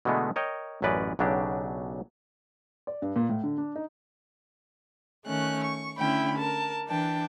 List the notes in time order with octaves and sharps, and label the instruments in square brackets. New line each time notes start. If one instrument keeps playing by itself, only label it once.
[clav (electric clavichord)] B2 D3 E3 G#3 A3 B3
A#4 C#5 D#5 G5
A1 F#2 C#4 B4 D5 D#5
B1 C#3 F#3 D4 G4
[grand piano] D5
G2
A#2
A2
D3
D4
D#4
[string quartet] D#3 A3 C#4 F#6
C#6
D3 A3 C#4 E4 G5 B5
A#4 A5
E3 D4 G5 A5